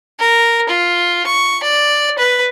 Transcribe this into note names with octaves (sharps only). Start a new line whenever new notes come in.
A#4
F4
C#6
D5
B4